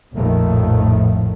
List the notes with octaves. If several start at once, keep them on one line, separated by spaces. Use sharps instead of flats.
A#1 F2 A2 D#3 F3 A3